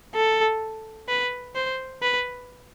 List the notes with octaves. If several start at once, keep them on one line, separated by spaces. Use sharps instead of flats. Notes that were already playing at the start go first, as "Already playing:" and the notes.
A4
B4
C5
B4